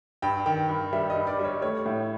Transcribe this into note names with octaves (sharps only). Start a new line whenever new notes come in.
G2 G5
D#3 G5
G2
G3 E5
D#5
G2
D5
G3
C#5
A3 C#5
A2